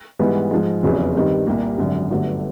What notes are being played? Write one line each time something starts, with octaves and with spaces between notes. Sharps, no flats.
G#2 E3 G3 B3
G#2 F3 G#3
F1 E2 C#3 F#3
G2 D#3 G3 C4
C2 A#2 G3 A#3
G#1 F#2 D3
G1 G2 D3 F#3 A3